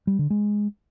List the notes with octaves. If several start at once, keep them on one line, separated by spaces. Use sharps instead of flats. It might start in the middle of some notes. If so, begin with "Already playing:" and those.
G3
D3
G#3